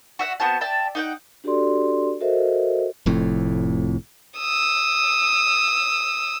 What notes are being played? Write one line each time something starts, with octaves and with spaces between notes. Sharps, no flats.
F#4 E5 F#5
B3 C4 F#4 A5
D5 E5 G5 A5
D#4 F#5 G5
D4 F#4 G4 A4 D5 C6
F#4 A4 A#4 C5 D#5 E5
F1 F2 A2
D#6 E6